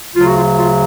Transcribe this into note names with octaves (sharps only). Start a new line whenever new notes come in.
D2 C#3 F#3 F4
F#4
F4
F4